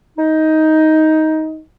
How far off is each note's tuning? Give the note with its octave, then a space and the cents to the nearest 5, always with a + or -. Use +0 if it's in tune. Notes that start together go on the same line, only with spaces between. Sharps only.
D#4 +15